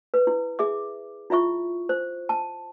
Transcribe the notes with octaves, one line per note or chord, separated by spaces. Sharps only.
B4
E4
G#4 E5 D6
E4 F4 E5 C#6
C5
A5